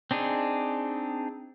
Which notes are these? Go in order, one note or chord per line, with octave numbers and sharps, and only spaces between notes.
C4 D4 D#4 G#4